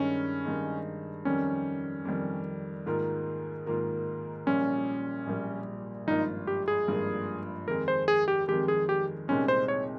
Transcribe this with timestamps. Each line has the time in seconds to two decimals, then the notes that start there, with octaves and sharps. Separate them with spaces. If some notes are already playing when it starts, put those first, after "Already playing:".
Already playing: G2 D#3 G#3 C#4 D#4
0.45 G2 D#3 G#3 D#4
1.25 F2 D#3 G3 C#4
2.05 F2 D#3 G3
2.86 G#2 D#3 A#3 F4 A#4
3.66 G#2 D#3 A#3 F4 A#4
4.47 A#1 A#2 G3 C#4
5.27 A#1 A#2 G3
6.07 G#1 G2 F3 A#3 D#4 F4
6.47 G4
6.68 G#4
6.88 G#1 G2 F3 A#3 F4
7.68 F2 D#3 G#3 A#4
7.88 C5
8.08 G#4
8.28 G4
8.48 F2 D#3 G#3 G4
8.68 G#4
8.89 G4
9.28 C2 A#2 G#3 C4 C#4 D#4
9.48 C5
9.68 C#5